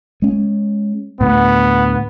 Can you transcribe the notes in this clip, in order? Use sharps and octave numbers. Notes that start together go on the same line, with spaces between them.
G#3 C#4
D2 A2 B3